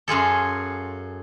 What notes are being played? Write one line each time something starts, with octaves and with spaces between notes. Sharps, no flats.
F#2 F4 G#4 A4